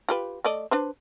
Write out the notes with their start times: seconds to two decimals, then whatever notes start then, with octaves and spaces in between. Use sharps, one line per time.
0.09 F4 G4 B4
0.44 A3 D5 D#5
0.71 D4 B4 C5